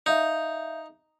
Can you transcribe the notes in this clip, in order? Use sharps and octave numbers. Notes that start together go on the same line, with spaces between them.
D#4 E5 F5 G6